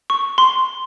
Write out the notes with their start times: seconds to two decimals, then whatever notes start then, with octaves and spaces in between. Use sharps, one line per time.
0.10 C#6
0.38 C6